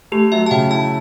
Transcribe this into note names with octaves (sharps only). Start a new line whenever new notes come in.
A3 G4
F#3 E5
A5
C#3 G5
E4 A5